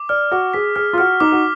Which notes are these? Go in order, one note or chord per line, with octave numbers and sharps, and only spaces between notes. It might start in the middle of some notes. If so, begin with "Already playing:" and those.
Already playing: D6
D5 F6
F#4 D6
G#4 B6
G#4 F6
F4
F#4 F6
D#4 D6
F#4